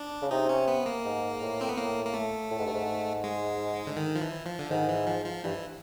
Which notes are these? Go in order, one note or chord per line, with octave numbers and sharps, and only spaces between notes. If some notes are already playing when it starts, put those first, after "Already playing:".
Already playing: D4
C#3
C3 D#4
C#4
B3
A#3
G#2
A2
C4
B3
A2 A#3
A#3
A3
A2
G#2
G2
G#2
G#3
D3
D#3
F3
E3
F3
D3
G#2 D#3
E3
F3
F3
G2 E3